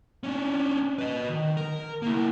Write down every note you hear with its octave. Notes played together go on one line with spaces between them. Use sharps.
C#4 D4
B4 D#5
D#3
A#4
A#3 E4